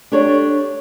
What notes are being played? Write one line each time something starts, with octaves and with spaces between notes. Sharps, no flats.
D4 G4 A4 C#5